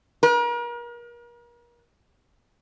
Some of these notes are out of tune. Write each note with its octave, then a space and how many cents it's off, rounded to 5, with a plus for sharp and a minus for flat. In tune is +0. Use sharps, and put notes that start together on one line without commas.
A#4 +40